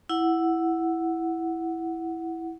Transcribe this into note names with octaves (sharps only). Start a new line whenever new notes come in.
E4 F#5